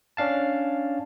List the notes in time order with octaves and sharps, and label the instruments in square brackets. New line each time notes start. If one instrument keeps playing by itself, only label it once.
[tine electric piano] C#4 D4 F5 A5